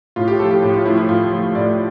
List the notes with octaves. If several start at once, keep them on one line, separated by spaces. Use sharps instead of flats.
A2 F4
G4
F3 A3 A4
G4
A2
F4
F3 A3 E4
E4
A2 F4
F3 A3
A2 D5